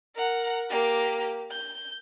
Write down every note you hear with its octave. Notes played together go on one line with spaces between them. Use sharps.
A#4 F#5
A#3 G4
G6